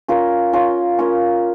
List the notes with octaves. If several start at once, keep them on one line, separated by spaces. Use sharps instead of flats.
C#4 F4 A#4
C#4 F4 A#4
C#4 F4 A#4